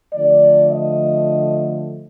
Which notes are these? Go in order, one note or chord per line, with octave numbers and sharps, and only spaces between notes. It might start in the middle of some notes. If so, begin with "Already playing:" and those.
D3 F3 A3 D5
D#5